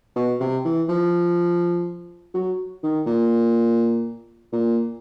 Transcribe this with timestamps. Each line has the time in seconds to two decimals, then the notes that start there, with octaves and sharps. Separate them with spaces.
0.16 B2
0.40 C3
0.65 E3
0.89 F3
2.34 F#3
2.84 D#3
3.07 A#2
4.53 A#2